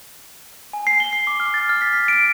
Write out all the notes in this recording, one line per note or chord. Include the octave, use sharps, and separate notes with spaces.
G#5
C7
G7
C7
D6
F6
A6
F6
B6
B6
D7